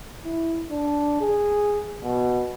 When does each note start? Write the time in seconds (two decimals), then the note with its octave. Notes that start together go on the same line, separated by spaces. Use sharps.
0.25 E4
0.70 D4
1.21 G#4
2.04 B2